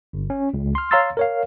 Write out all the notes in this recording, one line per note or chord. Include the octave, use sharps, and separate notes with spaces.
G1
C#4
C#2
C6 F6
C#5 F5 A#5 C6 E6 A6
A#4 C#5 F5